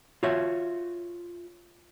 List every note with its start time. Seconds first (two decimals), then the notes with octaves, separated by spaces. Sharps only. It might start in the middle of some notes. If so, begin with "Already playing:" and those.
0.23 F4 F#4 C#5 E5